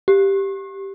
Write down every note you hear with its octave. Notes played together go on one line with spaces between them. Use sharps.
G4